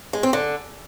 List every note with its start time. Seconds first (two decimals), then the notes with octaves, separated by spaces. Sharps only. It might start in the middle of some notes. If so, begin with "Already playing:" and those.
0.13 G#3
0.23 C4
0.33 D3